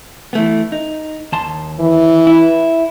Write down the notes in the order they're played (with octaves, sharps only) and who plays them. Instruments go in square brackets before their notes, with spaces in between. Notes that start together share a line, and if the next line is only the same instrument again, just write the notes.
[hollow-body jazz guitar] E3 A3 B3
D#4
D#2 A5 C6
[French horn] E3
[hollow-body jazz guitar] E4